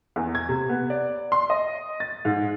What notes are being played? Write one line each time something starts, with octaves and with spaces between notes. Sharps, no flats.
E2
G#6
C3
B3
D5
C6
D#5
A6
G#2